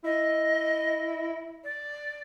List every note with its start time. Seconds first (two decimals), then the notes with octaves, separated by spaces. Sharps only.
0.04 E4 D#5
1.63 D5